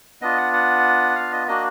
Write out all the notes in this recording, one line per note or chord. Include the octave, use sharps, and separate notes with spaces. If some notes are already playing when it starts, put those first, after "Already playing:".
B3 D4 F4 D#5
F#5
F#5
F5
D#5
A#3 D4 F#4 D#5